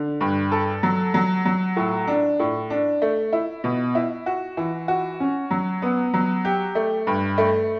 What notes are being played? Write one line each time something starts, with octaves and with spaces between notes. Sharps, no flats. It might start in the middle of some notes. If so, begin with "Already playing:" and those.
Already playing: D3
G2
A4
F#3
F#3
F#3
A2
D4
A2
D4
A3
E4
B2
E4
F#4
E3
F#4
C#4
F#3
B3
F#3
G4
A3
G2
A3